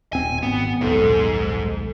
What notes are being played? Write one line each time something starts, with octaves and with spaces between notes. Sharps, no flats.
D#1 C4 G#5
G#1 B3
D#1 B1 G#2 A4